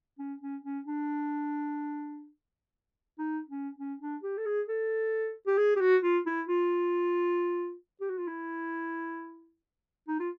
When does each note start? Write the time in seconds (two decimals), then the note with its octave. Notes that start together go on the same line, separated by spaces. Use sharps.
0.19 C#4
0.41 C#4
0.64 C#4
0.87 D4
3.18 D#4
3.48 C#4
3.79 C#4
4.01 D4
4.23 G4
4.37 A4
4.46 G#4
4.69 A4
5.47 G4
5.58 G#4
5.76 G4
5.81 F#4
6.02 F4
6.26 E4
6.48 F4
8.01 G4
8.10 F#4
8.18 F4
8.28 E4
10.08 D#4
10.19 F4